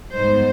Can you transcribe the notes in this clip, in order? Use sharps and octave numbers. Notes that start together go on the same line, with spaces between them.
G#2 G3 B3 D#4 C5